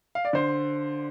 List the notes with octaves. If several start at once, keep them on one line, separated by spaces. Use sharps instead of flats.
F5
D5
D3 C5